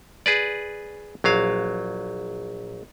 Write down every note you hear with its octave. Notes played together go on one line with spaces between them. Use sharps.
G#4 B4 D5
A#1 F#3 F5